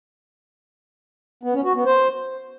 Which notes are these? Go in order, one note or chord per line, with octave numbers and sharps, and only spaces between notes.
B3
C#4
F#4
B3
C5